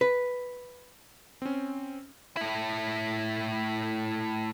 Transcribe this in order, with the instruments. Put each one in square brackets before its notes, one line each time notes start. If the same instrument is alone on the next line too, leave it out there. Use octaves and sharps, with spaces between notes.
[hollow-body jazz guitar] B4
[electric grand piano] C4 C#4
[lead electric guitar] A2 E4